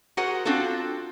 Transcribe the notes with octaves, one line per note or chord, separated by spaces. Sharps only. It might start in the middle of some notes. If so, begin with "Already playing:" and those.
F#4 G#4 A#4 C5 F#5
C4 D4 F4 F#4 A4